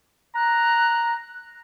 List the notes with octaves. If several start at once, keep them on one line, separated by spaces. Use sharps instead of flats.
A#5 F#6